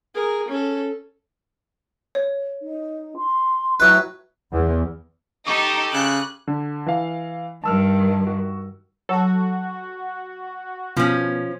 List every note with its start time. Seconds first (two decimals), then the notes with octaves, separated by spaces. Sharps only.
0.15 G#4 A#4
0.48 C#4 A4
2.15 C#5
2.62 D#4
3.17 C6
3.80 A2 F#3 B4 E5
4.52 E2
5.47 D#4 G4 A4 C#6 D6
5.93 C#3 F#6
6.47 D3
6.86 E3 F5
7.64 G2 D#3 A5 E6 F6
8.27 F#4
9.09 F#3 F#4 A4
10.97 B2 F3 C#4